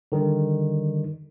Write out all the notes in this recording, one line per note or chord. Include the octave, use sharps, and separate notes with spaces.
D3 D#3 G3